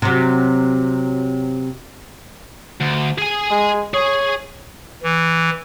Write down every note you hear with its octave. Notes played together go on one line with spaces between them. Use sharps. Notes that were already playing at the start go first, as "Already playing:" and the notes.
C3 F#3
D2
G#4 G#5
G#3
G#4 C#5
E3